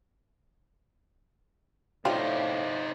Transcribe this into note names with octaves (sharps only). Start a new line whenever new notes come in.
A2 C3 D4 D#4 F4 G4 C5 F5